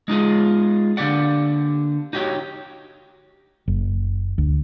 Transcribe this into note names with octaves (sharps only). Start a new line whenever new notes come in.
G#3 D#4 F4 G#4
D3 A#3 G4 D5 F#5
D#4 F#4 G4 C#5
F#1
D2